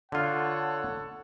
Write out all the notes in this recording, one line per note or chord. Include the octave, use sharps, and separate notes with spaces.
D3 F4 A4 C#5 F#5